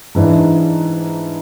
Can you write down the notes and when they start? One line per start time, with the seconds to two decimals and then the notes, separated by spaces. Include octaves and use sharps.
0.15 G#2 E3 G#3 D4